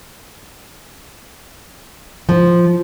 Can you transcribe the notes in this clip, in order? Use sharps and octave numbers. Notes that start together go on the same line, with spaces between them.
F3